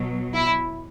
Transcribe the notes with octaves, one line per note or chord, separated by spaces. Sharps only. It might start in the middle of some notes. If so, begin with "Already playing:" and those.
Already playing: B2 F#3
E4